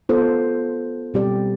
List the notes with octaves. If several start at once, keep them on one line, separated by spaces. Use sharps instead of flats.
B3 F4 A4 C5
B2 G3 C4 G4 D5